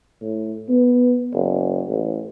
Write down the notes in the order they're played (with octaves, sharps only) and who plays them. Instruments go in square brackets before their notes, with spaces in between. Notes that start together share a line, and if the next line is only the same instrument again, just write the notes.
[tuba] A2
B3
F#1
A1